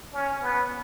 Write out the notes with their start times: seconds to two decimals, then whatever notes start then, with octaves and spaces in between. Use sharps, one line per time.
0.13 C#4
0.42 B3